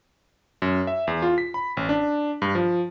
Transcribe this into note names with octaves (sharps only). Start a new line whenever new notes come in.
F#2
E5
E2
F4
B6
B5
A1
D4
G2
F3